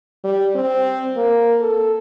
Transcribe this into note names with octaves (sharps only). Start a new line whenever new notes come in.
G3
C4
A#3
A4